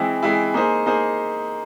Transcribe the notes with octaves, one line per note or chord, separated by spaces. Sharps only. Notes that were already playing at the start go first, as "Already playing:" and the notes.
Already playing: E3 G#3 C4 E4
E3 G#3 C4 E4
A#3 D#4 G#4 C5
A#3 D#4 G#4 C5